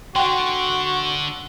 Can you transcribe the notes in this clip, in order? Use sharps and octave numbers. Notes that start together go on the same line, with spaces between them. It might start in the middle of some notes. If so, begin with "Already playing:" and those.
D3 F#4 F#5 G5 C6